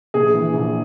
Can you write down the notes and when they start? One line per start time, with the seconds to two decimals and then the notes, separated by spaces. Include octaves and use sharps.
0.14 A#1 G#4
0.34 E3
0.54 A#1